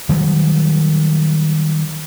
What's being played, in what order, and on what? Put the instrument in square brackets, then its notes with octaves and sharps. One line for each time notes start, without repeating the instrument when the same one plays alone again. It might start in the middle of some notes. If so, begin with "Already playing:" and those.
[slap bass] D#3 F#3 G3